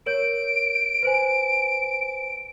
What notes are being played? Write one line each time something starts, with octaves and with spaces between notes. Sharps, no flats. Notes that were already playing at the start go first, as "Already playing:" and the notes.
A#4 C#5 G6 D7
B4 C5 G#5